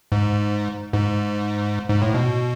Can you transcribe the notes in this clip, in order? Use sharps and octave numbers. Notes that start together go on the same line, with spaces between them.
G#2
G#2
G#2
A2
B2